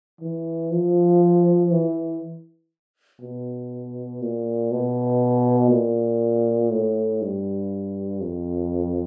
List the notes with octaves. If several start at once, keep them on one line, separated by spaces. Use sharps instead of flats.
E3
F3
E3
B2
A#2
B2
A#2
A2
G2
F2